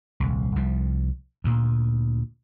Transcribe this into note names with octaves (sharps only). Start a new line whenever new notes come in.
D#1 C2
C2 F3 G3
D2 A#2